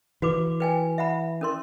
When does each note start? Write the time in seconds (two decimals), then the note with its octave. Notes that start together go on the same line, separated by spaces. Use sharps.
0.22 E3 F#4 B4 D6
0.60 B4 G5 G#5
0.98 E5 F#5 B5
1.41 C#4 A#4 C6